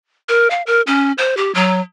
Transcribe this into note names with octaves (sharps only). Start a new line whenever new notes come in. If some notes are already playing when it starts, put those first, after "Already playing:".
A#4
F5
A#4
C#4
C5
G4
F#3